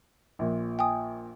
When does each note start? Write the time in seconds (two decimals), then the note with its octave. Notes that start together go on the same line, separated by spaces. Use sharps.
0.39 A#1 A#2
0.79 G5 G#5 D#6